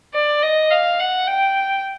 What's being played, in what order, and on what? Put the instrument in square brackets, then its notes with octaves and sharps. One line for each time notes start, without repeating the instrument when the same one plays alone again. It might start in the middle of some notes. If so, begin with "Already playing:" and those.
[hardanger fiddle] D5
D#5
F5
F#5
G5